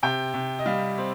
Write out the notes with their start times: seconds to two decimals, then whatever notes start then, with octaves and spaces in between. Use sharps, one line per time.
0.03 C3 G5
0.34 C3
0.59 D#5
0.66 G3 F5
0.98 C4